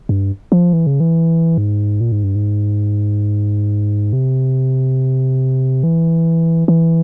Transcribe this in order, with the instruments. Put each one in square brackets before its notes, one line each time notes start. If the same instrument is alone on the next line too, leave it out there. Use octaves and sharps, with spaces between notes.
[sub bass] G2
F3
E3
C#3
E3
G#2
A#2
G#2
G2
G#2
C3
E3
E3